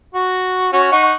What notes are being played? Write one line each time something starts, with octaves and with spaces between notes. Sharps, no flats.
F#4
C#4 F#4
D#4 F#5 C#6